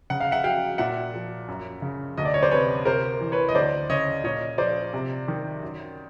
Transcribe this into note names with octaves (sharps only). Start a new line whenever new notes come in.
C#3 F#5
F5
E5 F#5
F#3 F5 G5
A#2 E5 F#5
F3
F#2
C#3
D2 D#5
D5
C#5
C5 D5
C3 B4 C#5
C3 A#4 C5
E3
B4 C#5
D#5
D2 C5 D5
C#3 C#5 D#5
A#2 C#5 D#5
F3 C5 D5
C3
D#3
F#2